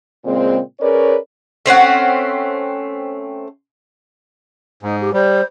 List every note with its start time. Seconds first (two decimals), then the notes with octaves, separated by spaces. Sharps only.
0.25 A#2 C#3 G#3 C4
0.80 C#4 G#4 A#4 B4 C#5 D5
1.66 A3 C4 C#4 F#5
4.83 G#2 D#4
5.00 G4
5.13 G3 C5